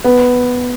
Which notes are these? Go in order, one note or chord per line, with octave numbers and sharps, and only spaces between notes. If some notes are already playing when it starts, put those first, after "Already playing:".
B3 B4